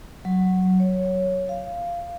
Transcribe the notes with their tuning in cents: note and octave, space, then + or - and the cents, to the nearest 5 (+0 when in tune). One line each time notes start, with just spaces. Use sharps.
F#3 +5
C#5 +0
F5 -10